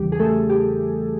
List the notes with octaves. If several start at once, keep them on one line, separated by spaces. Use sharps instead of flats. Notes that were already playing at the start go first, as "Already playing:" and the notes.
Already playing: E2 C#3 E3 G3 G4
G#4
A3 A4
G4